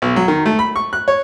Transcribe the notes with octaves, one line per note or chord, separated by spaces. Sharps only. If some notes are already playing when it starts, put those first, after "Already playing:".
B1
F#3
D#3
A3
B5
C#6
F#6
C#5